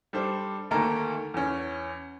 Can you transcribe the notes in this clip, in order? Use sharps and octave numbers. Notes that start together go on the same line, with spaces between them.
G3 D4 A4 C5
D2 D#3 A3 A#3 A4 A#5
E2 C#4